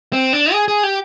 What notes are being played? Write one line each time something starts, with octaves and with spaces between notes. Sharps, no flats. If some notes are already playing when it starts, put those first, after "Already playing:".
C4
D4
G#4
G#4
G4